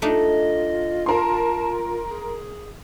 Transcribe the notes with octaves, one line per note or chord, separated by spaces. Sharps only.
A3 D4 D#4 F4 D#5
A#4 A5 C6
G#4